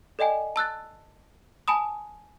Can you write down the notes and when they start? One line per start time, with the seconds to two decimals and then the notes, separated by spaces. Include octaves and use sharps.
0.19 A4 D5 D#5 G5 G#5
0.56 A5 E6 F#6 A6
1.68 G#5 A5 B5 D#6